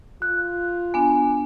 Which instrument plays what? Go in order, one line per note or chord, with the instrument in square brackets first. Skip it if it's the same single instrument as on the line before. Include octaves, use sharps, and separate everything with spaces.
[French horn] F4 [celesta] F#6
[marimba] B3 D4 [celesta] G#5